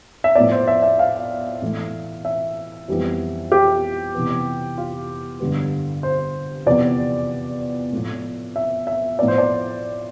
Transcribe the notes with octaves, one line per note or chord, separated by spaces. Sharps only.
E5
A2 F3 B3 D5
C5
E5
E5
F5
A2 E3 A3
E5
F2 E3 G3 B3
G4
C3 E3 B3
F4
G2 D3 G3 B3
C5
E2 C3 F3 B3 D5
A2 F3 A3
E5
E5
A2 F3 B3 D5
C5
D5